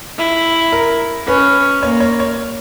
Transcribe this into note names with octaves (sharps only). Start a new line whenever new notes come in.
E4
A#4
C#4 B4
A#3 C#5
C#5
C#5